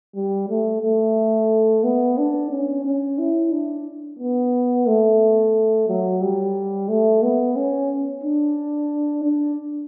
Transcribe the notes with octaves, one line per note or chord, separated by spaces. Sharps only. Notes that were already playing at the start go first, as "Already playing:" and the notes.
G3
A3
A3
B3
D4
C#4
C#4
E4
D4
B3
A3
F#3
G3
A3
B3
C#4
D4
D4